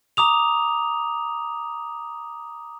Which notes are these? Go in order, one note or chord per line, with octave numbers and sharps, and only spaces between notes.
A#5 D6 D#6 F7